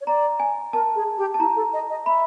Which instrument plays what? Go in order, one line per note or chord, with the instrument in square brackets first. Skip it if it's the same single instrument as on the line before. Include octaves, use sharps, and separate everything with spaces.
[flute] C#5
[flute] D5 [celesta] A#5
[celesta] G#5
[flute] A#4 [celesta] A5
[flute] G#4
G4
[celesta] A5
[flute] E4 [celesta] A#5
[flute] A4
D#5
D#5
[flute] E5 [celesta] B5